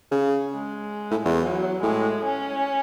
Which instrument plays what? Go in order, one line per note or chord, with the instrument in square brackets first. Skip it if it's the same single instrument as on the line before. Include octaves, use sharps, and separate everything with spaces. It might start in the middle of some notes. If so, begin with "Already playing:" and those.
[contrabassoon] C#3
[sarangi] G#3
[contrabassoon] A2
E2
[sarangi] F#3
[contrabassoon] A2 [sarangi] G#3
[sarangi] C#4